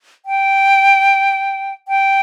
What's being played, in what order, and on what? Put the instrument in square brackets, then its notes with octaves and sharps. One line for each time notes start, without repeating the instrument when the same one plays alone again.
[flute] G5
G5